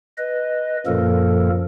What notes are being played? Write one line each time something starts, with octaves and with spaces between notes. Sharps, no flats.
B4 D#5
F#2 A#2 F3 A#3 A4 A#4